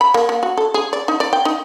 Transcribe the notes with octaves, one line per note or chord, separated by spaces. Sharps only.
B5
A#3
A#3
F#4
A4
G#4
D5
D#4
D5
G5
D#4